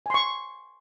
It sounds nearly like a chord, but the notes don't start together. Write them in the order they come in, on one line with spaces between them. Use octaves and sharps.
G#5 C6 C#6